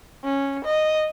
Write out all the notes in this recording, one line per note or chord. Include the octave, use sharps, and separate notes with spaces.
C#4
D#5